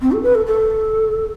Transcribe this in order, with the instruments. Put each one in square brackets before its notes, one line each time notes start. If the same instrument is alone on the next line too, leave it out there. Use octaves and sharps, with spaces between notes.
[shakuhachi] C4
A4
B4
A4
A4